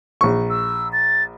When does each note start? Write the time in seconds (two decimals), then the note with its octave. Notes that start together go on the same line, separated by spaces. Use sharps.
0.21 A#1 C#6
0.50 E6
0.93 A6